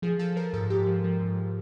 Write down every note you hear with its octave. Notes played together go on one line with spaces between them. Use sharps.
F3 G#4
F3 A4
F3 A#4
G#2 A4
G#2 G4
F3
F3
G#2